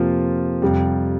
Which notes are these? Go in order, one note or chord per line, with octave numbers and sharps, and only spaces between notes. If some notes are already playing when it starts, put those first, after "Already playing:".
Already playing: F2 C3 F3 A#3 F4
F2 C3 G3